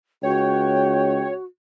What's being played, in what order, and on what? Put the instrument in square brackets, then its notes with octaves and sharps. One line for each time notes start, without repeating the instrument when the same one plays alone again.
[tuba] C#2 [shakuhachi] F#4 [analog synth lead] C#5 [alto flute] G5